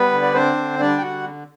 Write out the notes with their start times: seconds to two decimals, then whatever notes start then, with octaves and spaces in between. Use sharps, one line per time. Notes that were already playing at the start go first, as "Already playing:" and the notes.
Already playing: G3 B3 B4
0.12 D3
0.22 D5
0.34 C4 D4 C5
0.57 D3
0.79 G3 D4 D5
0.98 G5
1.02 D3 F#4 F#5